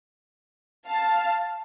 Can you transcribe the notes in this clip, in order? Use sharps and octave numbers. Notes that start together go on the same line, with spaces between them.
F5 A5